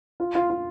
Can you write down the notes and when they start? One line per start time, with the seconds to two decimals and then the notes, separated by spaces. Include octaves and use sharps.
0.20 F4
0.35 F4
0.50 F4